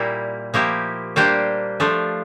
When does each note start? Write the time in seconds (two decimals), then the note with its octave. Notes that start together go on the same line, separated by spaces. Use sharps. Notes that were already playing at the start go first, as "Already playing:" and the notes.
Already playing: A#2 G3 A#3 E4
0.54 F3 A#3 E4 G4
1.16 G3 A#3 D4 G4 C5
1.80 F3 A3 D4 F4